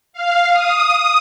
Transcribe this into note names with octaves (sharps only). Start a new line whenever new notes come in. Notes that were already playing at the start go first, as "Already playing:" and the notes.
F5
D#6